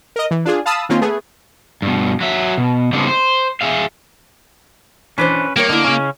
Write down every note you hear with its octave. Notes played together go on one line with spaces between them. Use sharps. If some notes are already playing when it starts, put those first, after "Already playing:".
A#4 D#5
E3
D4 F4 G#4
F5 A5 B5 D#6 E6
D#3 A#3 C4 C#4 F4
A3 B3 G#4
G2 B2
F#3 E5
B2
C#3 G3 B3 C4 D4 D#4
C5
G#4 E5 F5
E3 C#4 D4 B4 C5
G3 A#3 A#4 C#5
D3 E4 D#5
C#3 C#4